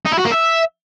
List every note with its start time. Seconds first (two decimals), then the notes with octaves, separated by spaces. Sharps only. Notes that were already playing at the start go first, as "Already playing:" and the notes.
0.05 D#4
0.12 E4
0.18 F#4
0.25 A#3
0.31 E5